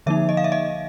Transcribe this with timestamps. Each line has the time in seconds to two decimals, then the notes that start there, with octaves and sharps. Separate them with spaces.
0.06 D3 F3 A#3 D#4 E5
0.29 D#5
0.37 F5
0.44 E5
0.52 D#5